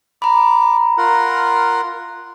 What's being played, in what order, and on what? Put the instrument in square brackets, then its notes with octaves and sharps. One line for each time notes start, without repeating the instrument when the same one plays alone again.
[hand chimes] A#5 B5 [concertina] D6
[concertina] F4 A#4 F#5